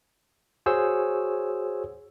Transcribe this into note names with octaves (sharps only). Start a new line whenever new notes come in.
F#4 G#4 C5 C#5 G#5 E6